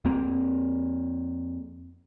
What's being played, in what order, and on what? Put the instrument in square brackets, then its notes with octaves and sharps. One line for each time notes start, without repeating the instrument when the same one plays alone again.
[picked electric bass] F2 A#3 C4